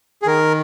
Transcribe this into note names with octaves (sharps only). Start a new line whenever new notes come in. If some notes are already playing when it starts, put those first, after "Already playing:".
G#4
D#3 A#4